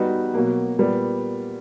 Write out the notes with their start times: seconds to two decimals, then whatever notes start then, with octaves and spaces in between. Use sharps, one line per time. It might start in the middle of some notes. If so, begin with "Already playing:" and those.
Already playing: G3 B3 D#4 F#4 B4
0.34 B2 F#3 A#3
0.79 A#2 G3 B3